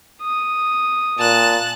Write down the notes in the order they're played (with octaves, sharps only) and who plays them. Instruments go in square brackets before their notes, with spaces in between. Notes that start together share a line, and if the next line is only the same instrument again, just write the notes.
[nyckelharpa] D#6
[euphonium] A#2 [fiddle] A5 F#6